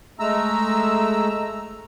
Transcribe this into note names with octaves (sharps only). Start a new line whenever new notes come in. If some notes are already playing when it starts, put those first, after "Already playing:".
G#3 A3 A#5 E6